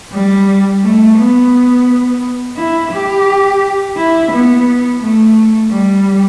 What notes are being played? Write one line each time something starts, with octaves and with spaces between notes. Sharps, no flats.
G3
A3
B3
E4
G4
E4
B3
A3
G3